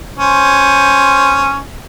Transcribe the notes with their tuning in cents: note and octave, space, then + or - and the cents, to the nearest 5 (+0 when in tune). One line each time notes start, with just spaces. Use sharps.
C#4 +0 C5 +5